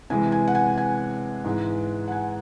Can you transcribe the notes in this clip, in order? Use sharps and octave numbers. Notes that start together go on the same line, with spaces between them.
C3 E3 G#3 G#5
G#5
F#5
G#5
G#5
G#2 E3 G#3
F#5
G#5